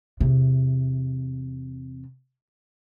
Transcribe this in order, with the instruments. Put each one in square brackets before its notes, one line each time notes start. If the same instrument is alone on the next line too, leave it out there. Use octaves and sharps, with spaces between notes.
[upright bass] E2 C3